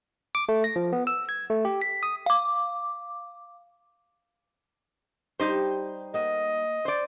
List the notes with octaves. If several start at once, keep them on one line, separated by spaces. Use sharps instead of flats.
D6
A3
A#6
F3
B3
E6
G#6
A3
G4
B6
D#6
F5 D6
G3 D#4 G4 C5
A#3 F#4 D#5
C5 D5